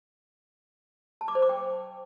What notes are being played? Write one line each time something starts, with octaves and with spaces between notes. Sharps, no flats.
A5
D6
C5
D6
G5